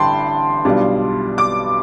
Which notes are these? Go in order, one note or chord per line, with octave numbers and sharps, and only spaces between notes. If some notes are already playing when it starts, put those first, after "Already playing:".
Already playing: A1 G2 D3 G3 G5 A5 B5 C6
B1 B2 G3 D4 F4
D6